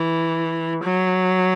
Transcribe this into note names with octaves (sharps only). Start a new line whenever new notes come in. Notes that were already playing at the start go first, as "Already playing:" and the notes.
Already playing: E3
F#3